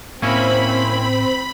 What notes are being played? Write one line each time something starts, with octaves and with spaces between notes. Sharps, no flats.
A2 A#3 C4 C#4 E4 B5